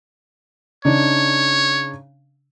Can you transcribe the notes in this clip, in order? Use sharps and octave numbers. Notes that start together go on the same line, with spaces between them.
C#3 D4 D#4 C#5